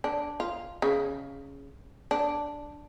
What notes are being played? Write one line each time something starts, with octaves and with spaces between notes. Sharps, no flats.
D4
F4
C#3
D4